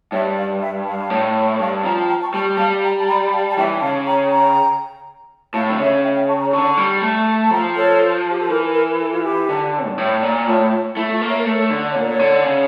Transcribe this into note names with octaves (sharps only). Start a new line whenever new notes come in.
G2 C#5 E5
D5 F5
E5 G5
F5 A5
A2
G2 F5 A5
F3 G5 A#5
G5 A#5
A5 C#6
G3 A5 C#6
G3 F5 A5
G5 A#5
A5
G5 A#5
F5 A5
A5
E3 E5 G5
C#3 F5 A5
G5 A#5
G5 A#5
A2 F5 A5
D3
C#3 C#5 E5
E5 G5
E5 G5
A5 C#6
G5 A#5
D3 A5 C#6
G3
A3
F3 G5 A#5
A4 C#5
G4
A4
E3 A#4
A#4
A4
F4
G4
D3
G2
A2
A#2
A2 F4
F4
A3 E4
F4
A#3
C#5 E5
A#4
A3 A4 C#5
A4 C#5
D3
D5
C#5
A#2 A#4
A4 C#5
D3
C#3